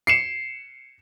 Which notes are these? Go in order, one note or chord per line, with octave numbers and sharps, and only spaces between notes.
C7 C#7 E7